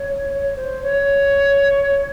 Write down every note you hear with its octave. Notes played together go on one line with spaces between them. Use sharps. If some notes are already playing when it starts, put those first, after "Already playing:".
Already playing: C#5
C#5
C5
C#5